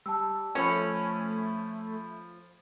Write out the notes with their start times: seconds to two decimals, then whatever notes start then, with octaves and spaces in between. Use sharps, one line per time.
0.06 G3 A5 E6
0.55 F3 A3 C#4 B5